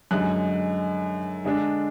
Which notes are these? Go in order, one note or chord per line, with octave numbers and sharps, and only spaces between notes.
F#2 D3 G#3 D#4 F#6
D3 G#3 D4